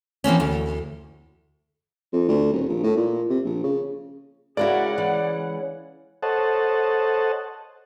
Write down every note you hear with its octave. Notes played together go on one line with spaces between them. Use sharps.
E3 A#3 C4 C#4
D2
F2
D2
D#1
A#1
A2
A#2
C3
A#1
C#3
C#3 G#3 E4 F#4 A#4 D5 F#5
E3
A4 C5 C#5 D#5 F#5 A5